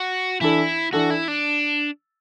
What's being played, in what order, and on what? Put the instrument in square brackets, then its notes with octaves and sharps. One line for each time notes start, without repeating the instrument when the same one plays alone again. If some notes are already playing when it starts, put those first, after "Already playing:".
Already playing: [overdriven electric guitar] F#4
[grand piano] E3 D4 A4 [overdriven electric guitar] E4
[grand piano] E3 D4 A4 [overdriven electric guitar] F#4
[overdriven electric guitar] E4
D4